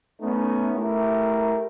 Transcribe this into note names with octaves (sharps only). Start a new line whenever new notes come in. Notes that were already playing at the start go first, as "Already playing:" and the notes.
A3 B3 C#4 D#4
A3 E4 G4 A#4